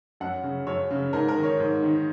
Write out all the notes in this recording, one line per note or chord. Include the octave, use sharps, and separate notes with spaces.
F#2 F#5
C#3
F#2 C#5
C#3
G#2 A#4
A#4
D#3
C#5
G#2
D#3